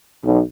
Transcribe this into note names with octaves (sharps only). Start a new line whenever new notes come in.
B1